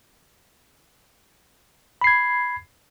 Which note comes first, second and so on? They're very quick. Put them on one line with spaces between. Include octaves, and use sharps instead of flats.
B5 C7 G#6